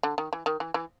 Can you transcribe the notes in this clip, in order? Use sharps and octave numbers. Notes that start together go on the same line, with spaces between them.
D3
D#3
E3
D#3
E3
E3